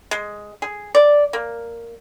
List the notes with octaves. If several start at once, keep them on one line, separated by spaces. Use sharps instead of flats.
G#3
G#4
D5
A#3